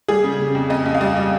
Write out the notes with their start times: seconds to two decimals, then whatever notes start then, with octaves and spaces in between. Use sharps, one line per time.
0.08 G3 G#4
0.24 C#3
0.39 C#3
0.55 F2
0.70 F2 D#5
0.86 F2
0.95 F5
1.01 G3 D#5
1.16 G3